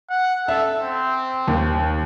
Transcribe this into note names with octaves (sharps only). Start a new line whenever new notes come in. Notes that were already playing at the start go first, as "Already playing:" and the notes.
F#5
A4 E5
C4
D#2 D#3